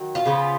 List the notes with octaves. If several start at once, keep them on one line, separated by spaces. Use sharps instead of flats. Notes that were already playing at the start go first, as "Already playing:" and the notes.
Already playing: D#3 F#3
F4
C#3 F3 B3